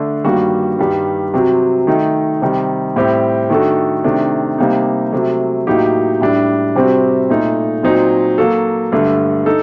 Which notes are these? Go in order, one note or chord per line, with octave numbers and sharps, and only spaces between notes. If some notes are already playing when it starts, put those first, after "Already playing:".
Already playing: D3 A3 D4
G2 D#3 G3 A#3 F#4
G2 D#3 G3
C3 F#3 C4 F#4
D#3 A3 D#4
C3 D#3 G3
A2 G3 C4 G4
D#3 A3 D4 F#4 A4
C3 D#3 A3 D4
C3 G3 A#3 D#4
C3 F#3 A3
A2 F#3 A#3 D#4 G4
A2 G3 D4
C3 G3 C4 F#4
A#2 A3 D#4 A4
A#2 F#3 C4 D#4
F#3 A#3 F#4 A4
G2 D3 A3
D#4 A4